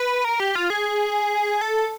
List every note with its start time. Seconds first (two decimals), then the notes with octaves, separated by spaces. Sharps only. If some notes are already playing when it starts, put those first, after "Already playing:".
Already playing: B4
0.25 A#4
0.40 G4
0.55 F4
0.70 G#4
1.61 A4